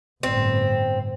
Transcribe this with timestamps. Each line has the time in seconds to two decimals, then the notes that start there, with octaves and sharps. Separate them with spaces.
0.23 G1 A2 C4